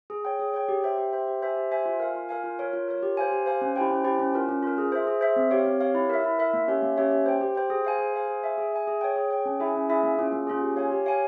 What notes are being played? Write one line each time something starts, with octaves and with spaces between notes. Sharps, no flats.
G#4
C#5 G5
G#4
C#5 G5
G4
C5 E5 G5
G4
C5 E5 G5
G4
C5 E5 G#5
G4
C5 E5 G#5
F4
A#4 F5 G#5
F4
A#4 F5 G#5
F4
A#4 C#5
F4
A#4 C#5
G4
C5 F5 G#5
G4
C5 F5 G#5
C#4
E4 G4 C5 G5
C#4
E4 G4 C5 G5
C#4
F4 A#4
C#4
F4 A#4
G#4
C5 E5
G#4
C5 E5
C4
G4 C#5 F5
C4
G4 C#5 F5
E4
A#4 E5
E4
A#4 E5
A#3
C#4 G4 C#5 E5
A#3
C#4 G4 C#5 E5
G4
C5 G5
G4
C5 G5
G#4
C5 F5 G#5
G#4
C5 F5 G#5
G#4
E5 G#5
G#4
E5 G#5
G#4
C#5 G5
G#4
C#5 G5
C#4
E4 G#4 E5 G#5
C#4
E4 G#4 E5 G#5
A#3
C#4 F4 G#4
A#3
C#4 F4 G#4
G4
C#5 F5 G#5
G4
C#5 F5 G#5